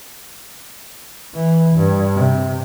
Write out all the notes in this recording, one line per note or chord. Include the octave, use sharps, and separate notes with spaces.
E3
G2
C3